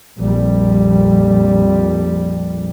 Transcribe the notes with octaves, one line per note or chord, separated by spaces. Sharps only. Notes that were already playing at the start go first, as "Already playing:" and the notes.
A#1 F2 G3